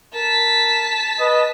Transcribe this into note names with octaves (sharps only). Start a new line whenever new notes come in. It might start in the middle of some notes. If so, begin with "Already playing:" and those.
A#4 A5 B6
B4 D#5